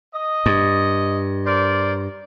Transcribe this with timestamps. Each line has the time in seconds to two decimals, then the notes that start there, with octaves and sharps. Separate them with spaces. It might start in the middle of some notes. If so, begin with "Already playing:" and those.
0.15 D#5
0.46 G2
1.46 A#4 C5 D5